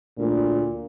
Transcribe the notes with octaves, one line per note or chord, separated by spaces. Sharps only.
D2 A#2